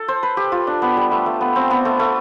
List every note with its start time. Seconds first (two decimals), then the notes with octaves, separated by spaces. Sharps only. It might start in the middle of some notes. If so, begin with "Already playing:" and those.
Already playing: A4
0.08 C5
0.23 B4
0.37 G4
0.52 F4
0.67 D4
0.82 B3
0.97 G3
1.11 A3
1.26 A3
1.41 B3
1.56 C4
1.70 B3
1.85 A3
1.99 A3